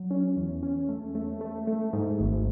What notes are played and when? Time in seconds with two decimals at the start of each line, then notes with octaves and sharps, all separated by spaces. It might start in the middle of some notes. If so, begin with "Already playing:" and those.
Already playing: F#3
0.11 C#4
0.37 E2
0.63 C#4
0.89 A3
1.15 A3
1.41 A3
1.67 A3
1.93 G#2
2.20 G#1